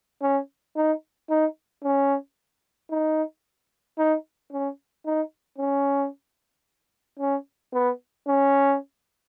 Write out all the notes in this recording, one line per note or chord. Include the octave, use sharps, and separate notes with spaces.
C#4
D#4
D#4
C#4
D#4
D#4
C#4
D#4
C#4
C#4
B3
C#4